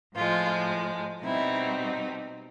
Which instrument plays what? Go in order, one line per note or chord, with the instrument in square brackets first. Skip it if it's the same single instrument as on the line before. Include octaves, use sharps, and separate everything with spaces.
[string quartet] A2 F3 G#3 F4
B2 G3 C4 D#4 E4